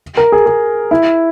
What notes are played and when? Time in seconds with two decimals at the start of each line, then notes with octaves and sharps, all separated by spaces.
0.17 A#4
0.32 G#4
0.46 G#4
0.91 E4